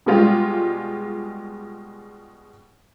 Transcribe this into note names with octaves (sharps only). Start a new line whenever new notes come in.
B2 G3 G#3 F4 G4